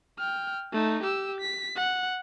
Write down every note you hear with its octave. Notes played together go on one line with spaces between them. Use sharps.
G5 F6
A3 D#4
G4 E6
B6
F#5